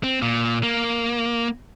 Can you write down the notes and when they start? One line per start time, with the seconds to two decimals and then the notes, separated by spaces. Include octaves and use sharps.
0.03 C4
0.22 A#2
0.63 A#3